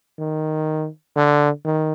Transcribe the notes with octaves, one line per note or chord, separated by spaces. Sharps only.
D#3
D3
D#3